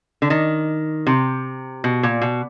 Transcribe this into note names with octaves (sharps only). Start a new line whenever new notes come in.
D3
D#3
C3
B2
A#2
B2